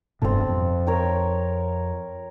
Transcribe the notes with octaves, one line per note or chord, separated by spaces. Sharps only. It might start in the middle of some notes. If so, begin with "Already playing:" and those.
F1 G2 B2 C4 A4
F2
A#4 C#5 G5